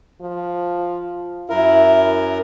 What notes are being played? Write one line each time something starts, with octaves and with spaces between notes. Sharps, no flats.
F3
F#2 E4 A#4